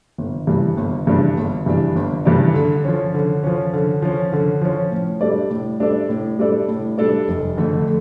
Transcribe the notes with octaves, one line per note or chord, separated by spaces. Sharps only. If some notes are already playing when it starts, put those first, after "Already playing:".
G1
G2 E3 G3 D4
G1
G2 E3 G3 D4
G1
G2 E3 G3 D4
G1
G2 E3 G3 D4
D3
F3 C#4
D3
F3 C#4
D3
F3 C#4
D3
F3 C#4
A2
G3 D4 A4 D5
A2
G3 D4 A4 D5
A2
G3 D4 A4 D5
A2
G3 D4 A4 D5
F1
F2 D3 A3